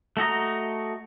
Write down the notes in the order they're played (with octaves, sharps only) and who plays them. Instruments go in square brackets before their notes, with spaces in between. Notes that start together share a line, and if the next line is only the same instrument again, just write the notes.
[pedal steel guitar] A3 F#4 D#5 A#5